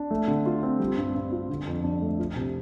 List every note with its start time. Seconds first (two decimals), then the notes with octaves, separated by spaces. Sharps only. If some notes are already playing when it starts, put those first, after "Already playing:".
Already playing: D4
0.11 A3
0.28 D3
0.46 F4
0.63 C4
0.79 G3
0.97 G2
1.15 G2
1.32 F4
1.50 D3
1.67 F2
1.84 D4
2.02 A3
2.19 F3
2.36 C3